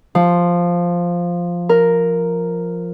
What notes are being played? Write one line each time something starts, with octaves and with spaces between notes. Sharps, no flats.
F3
A#4